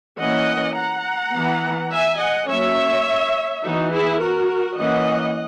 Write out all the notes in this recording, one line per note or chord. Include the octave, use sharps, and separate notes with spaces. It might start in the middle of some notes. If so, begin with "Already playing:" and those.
E3 A#3 C#4 D#5 F#5
F#5 A#5
E3 B3
E5 G#5
D#5 F#5
F#3 A#3 C#4 C#5 E5
E3 B3 D#4 F#4
E4 G#4
F#4 A#4
E3 A#3 C#4 D#5 F#5